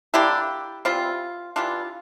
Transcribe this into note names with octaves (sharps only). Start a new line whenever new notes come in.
D3 G3 A#3 D4 E4 G4
E3 G3 C4 F4
E3 G3 D4 F4